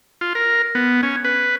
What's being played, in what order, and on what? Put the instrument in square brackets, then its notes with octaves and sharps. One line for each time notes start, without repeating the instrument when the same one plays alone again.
[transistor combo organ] F4
A#4
B3
C#4
B4